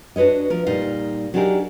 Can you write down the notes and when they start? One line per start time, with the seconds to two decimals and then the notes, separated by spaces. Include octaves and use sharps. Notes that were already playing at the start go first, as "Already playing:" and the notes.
0.16 D4 F#4 B4 C#5 D#5
0.50 F3 A#4
0.66 A#2 G3 D#4 F5
1.34 F#3 D4 D#4 G4 G#4 A#4